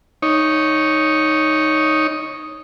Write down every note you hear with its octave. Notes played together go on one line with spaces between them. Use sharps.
D#4 C#5